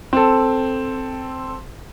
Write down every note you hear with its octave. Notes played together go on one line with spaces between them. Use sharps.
C4 A4